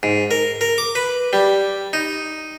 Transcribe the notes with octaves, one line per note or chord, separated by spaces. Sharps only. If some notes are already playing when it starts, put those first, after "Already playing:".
G#2
A#4
A#4
D6
B4
G3
D#4